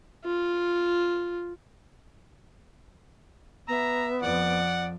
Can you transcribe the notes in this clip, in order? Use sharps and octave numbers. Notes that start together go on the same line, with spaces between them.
F4
B3 E5 A#5
F2 D5 F#5